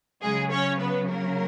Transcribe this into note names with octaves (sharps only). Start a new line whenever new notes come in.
C#3 F#3 G#3 G#4
C#4 C#5
B3 B4
A#3 A#4